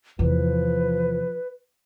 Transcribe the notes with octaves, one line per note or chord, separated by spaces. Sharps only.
E2 C3 F3 B4